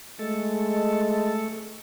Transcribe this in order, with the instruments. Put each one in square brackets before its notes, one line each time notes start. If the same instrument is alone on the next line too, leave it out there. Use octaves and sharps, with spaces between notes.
[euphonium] G#3 [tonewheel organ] A3 A4